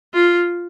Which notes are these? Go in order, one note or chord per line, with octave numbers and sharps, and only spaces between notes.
F4